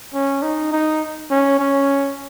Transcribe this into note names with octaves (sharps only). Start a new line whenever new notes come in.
C#4
D#4
D#4
C#4
C#4